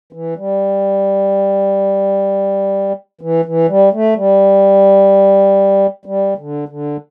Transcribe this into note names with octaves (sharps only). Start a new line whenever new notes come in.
E3
G3
E3
E3
G3
A3
G3
G3
D3
D3